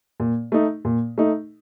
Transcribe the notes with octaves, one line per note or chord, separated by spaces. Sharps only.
A#2
A3 D#4
A#2
A3 D#4